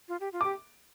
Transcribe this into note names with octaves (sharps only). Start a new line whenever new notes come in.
F4
G4
F4
D6
G4